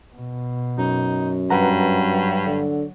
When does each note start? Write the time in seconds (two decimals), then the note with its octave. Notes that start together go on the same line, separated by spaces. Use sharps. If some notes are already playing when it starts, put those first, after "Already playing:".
0.15 B2
0.78 F#2 D#4
1.50 G2 F#3 B4 F#5 A#5
2.46 D3